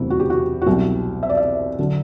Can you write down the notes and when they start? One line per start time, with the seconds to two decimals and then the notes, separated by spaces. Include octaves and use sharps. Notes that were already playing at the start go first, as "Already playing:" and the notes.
Already playing: E1 D2 C3 F#3 E4
0.10 F#4
0.20 G4
0.30 F#4
0.62 F#4
0.66 C2 B2 F#3 G4
1.23 E5
1.29 D5
1.37 E5
1.79 D3 F#3